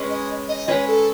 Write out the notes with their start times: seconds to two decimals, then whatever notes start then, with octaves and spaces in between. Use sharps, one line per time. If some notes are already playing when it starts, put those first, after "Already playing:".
Already playing: G#3 C#4 G#4 B4
0.10 D#5
0.48 D#5
0.68 G#3 C#4 G#4 B4 C#5
0.87 A4